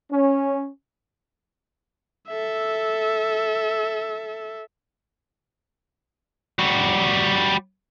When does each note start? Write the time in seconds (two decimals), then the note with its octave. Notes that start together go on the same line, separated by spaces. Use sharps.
0.11 C#4
2.28 A4 E5
6.59 G3 F#4